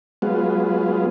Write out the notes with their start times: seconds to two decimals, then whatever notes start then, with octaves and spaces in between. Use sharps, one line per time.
0.22 F#3 G#3 B3 F4